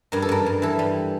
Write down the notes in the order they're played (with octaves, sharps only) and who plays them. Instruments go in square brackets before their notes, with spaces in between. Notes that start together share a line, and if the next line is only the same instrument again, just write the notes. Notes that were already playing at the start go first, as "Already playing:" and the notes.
[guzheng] G2 A#4
A4
G2 A#4
G2
E3 A4
G3